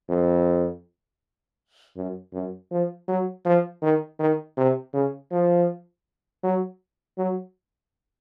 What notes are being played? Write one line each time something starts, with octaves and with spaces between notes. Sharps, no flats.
F2
F#2
F#2
F3
F#3
F3
D#3
D#3
C3
C#3
F3
F#3
F#3